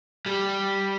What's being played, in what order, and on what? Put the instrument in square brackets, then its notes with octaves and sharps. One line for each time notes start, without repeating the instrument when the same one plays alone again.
[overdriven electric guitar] G3